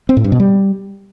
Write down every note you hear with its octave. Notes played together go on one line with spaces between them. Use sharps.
C4
A2
G2
B2
G3